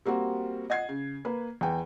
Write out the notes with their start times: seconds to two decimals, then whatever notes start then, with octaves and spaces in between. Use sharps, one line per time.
0.06 G3 A#3 C4 F#4
0.70 D#5 F#5 G#6 C7
0.89 C#3
1.25 A#3 B4
1.61 E2 E3 G5